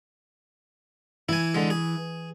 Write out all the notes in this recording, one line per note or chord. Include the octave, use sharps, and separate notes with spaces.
E3 E4 G#5
D3 G#3
G#4